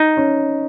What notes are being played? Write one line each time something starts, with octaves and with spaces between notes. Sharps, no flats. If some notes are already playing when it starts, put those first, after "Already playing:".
Already playing: D#4 D#5
C#4